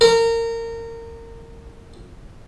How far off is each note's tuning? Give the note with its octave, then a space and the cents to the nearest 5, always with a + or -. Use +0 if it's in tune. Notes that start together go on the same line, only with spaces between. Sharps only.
A#4 -25